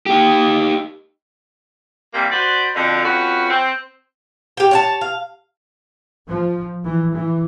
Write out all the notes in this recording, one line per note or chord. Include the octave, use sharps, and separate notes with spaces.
D#4 G4
C3 E3 G3 A#3
F#4 B4 C5 D5
F2 B2 D3
F2 C#4 F#4 B4
C4
G4 G5
C#5 F#5 A5
F5
F3
E3
E3